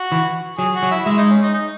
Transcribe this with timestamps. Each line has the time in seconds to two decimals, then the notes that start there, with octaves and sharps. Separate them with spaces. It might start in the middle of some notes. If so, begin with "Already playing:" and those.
Already playing: F#4
0.12 E3
0.58 F#3 G#4
0.75 F#4
0.83 F#3
0.91 E4
1.06 G#3 E4
1.18 D#4
1.30 C#4
1.42 D#4
1.54 D#4